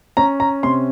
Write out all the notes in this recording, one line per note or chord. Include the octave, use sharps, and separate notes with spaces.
C#4 A#5
A#5
C3 C6